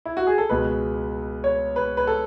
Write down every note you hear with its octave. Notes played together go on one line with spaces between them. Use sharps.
E4
F#4
G#4
A4
C#2 B2 G#3 B4
C#5
B4
B4
A4